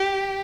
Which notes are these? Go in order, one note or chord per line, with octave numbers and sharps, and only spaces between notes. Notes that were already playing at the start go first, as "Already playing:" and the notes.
Already playing: G4